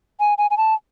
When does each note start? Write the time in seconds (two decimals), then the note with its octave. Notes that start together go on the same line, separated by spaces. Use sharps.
0.20 G#5
0.38 G#5
0.51 G#5
0.57 A5